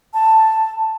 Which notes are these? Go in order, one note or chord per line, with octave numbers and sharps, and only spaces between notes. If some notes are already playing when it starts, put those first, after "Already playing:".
A5